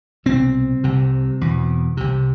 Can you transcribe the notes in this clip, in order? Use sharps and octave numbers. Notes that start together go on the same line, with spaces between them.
C2 B2 C4
C2 C3
E2 B2
C2 C3